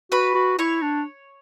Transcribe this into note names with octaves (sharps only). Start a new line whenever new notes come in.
F#4 B4 B5
F#4
E4 C#5 C#6
D4